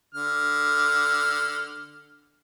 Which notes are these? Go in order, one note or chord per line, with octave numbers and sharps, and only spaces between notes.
D3 F6